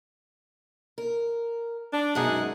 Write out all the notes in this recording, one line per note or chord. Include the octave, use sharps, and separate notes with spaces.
A#4
D4
F#2 B2 G#3 D#4 G#4 F#5